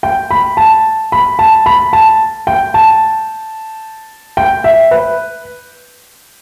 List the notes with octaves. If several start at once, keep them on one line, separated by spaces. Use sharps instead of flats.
G5
B5
A5
B5
A5
B5
A5
G5
A5
G5
E5
B4